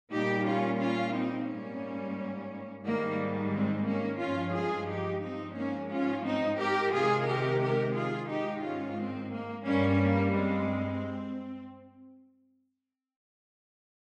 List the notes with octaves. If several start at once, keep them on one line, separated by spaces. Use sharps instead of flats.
A#2 G3 D#4 G4
C#4 F4
C#4 F4
C4 D#4
G#2 G3 A#3 C#4
G#2 D#3 G3 A#3
G#3 C4
A#3 C#4
G2 F3 G#3 C#4 F4
F4 G#4
D#4 G4
C4 D#4
G#2 F3 G#3 A#3 C#4
C#4 F4
C4 D#4
G4 A#4
C3 D#3 G#3 F4 G#4
G4 A#4
G4 A#4
F4 G#4
G#2 D#3 G#3 D#4 G4
C#4 F4
G#3 C4
A#3
G2 G3 A#3 C#4
A#3
G#3 C4